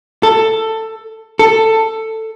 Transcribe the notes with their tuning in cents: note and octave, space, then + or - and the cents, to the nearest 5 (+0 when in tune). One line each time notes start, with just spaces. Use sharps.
A4 +15
A4 +15